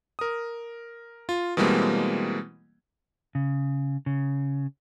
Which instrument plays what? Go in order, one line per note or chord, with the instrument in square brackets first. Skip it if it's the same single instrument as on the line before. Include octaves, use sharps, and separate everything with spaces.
[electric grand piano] A#4 D#6
F4
B2 E3 G3 G#3 A#3 C4
[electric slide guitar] C#3
C#3